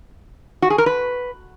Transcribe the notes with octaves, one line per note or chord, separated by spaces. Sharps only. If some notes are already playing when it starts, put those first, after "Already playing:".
F#4
G#4
A#4
B4